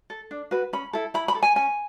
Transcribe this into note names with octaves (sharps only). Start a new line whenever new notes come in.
A4
D4
F#4 B4
C#4 B5
E4 A4
E4 B5
B5
A4
G#5
C#4 G#5